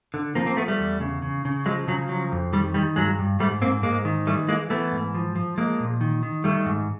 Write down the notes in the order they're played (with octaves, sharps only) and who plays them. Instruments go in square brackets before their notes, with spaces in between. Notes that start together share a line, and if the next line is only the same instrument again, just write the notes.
[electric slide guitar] D3
F3 A#3 C4
A#3 C4
F3 A3 B3
G3 A3
E2
C#3
C#3
C#3
F3 F#3 G#3
C#3 F#3
F3 F#3
F2
D#3 G3
D#3 G3
G2 F#3 G#3
G2
G#2 G3 A3
G#2 A#3 C4
G#2 G#3 A#3
D#3
E3 G3 A3
E3 G#3 A#3
E3 A3 B3
G#2
F3
F3
F3 G#3 A#3
A#2
D#3
D#3
D#3 G3 A3
G#2